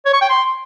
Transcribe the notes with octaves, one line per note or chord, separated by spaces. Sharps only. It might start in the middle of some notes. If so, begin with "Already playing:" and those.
C#5
C#6
G5
C6